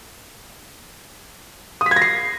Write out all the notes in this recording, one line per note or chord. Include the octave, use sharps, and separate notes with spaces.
D#6
B6
G#6
A#6
C7